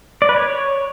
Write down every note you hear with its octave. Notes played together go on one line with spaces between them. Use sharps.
D5
B4
C#5